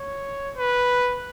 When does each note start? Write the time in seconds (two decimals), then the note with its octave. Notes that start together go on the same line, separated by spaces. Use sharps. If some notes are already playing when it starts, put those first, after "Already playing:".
Already playing: C#5
0.57 B4